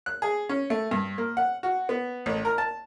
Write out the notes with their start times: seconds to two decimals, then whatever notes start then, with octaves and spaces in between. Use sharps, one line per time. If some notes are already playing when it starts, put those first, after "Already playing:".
0.06 F#6
0.22 G#4
0.49 C#4
0.70 A3
0.91 G2
1.18 A#3
1.37 F#5
1.63 F#4
1.89 B3
2.26 A1
2.45 A#4
2.58 A5